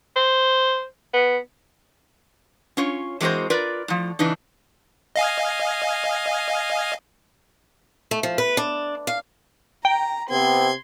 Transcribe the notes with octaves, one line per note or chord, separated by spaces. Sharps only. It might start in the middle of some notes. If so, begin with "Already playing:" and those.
C5
B3
C#4 F4 C#5
E3 G#3 C4 F#4 A#4 C5
F4 A#4 B4 D5
A2 F3
C#3 E3 D4 D#4
D#5 F5 G#5
A3
F3
B4
D4
F5
G5 A#5
C3 B3 C4 C6 G#6